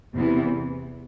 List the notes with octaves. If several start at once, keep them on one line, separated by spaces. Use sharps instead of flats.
E2 C3 E3 B3